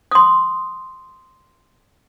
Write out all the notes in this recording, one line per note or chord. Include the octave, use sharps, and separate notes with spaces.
C6 D#6